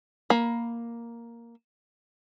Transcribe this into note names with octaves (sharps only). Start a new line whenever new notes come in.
A#3 B5